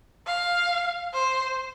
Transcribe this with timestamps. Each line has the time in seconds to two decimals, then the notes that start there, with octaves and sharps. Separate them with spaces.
0.27 F5
1.14 C5